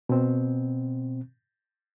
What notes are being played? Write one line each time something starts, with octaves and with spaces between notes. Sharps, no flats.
B2 C4